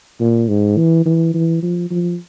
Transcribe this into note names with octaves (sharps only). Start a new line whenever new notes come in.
A#2
G#2
E3
E3
E3
F3
F3